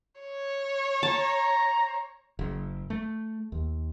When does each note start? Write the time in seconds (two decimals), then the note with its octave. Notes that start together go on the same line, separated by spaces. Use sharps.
0.21 C#5
1.03 A5 A#5
2.39 F#1
2.90 A3
3.52 D#2